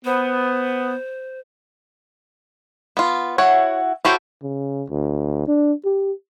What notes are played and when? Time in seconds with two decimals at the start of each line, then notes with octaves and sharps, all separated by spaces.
0.05 B3 C5
2.97 B3 F4
3.38 E4 F#4 C#5 F#5
4.05 E4 F#4 G4 A4 C5 C#5
4.43 C#3
4.89 D2
5.48 D4
5.85 G4